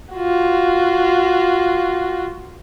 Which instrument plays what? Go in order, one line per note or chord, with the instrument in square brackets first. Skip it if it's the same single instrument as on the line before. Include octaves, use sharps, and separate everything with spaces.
[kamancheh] F4 F#4